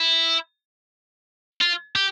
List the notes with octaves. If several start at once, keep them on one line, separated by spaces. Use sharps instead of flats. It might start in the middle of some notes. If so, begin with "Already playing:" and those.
Already playing: E4
F4
G4